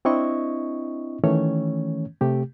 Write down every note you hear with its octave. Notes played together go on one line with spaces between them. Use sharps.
C4 D4 E4 D#5 C#6
D#3 E3 A3 C#4 C#5
C3 A3 G4